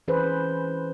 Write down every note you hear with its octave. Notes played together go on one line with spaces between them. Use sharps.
E3 C#4 G#4 B4 C5